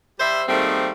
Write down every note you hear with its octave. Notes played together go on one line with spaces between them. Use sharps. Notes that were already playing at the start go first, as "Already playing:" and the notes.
G3 C5 E5
G#2 D#3 G3 A3 A#3 C4